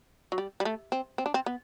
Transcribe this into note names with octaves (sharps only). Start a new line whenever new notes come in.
F#3
G3
G3
A3
C4
C4
D4
C4
B3